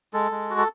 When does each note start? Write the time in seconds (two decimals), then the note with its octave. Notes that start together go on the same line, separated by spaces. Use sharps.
0.13 G#3 A4
0.31 G#3
0.50 F#4
0.58 A4